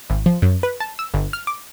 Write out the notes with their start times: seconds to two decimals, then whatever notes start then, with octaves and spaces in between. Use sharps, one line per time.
0.10 G#1
0.26 F3
0.42 F#2
0.63 B4
0.80 A5
0.99 E6
1.14 G1
1.33 F6
1.47 D6